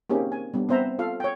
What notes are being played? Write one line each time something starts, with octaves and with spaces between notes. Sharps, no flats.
A#3 C4 C#4 D#4 G4 G#4
G#5
G3 B3 D4
B3 C4 C5 E5 A#5
F4 A4 F5
C#5 G5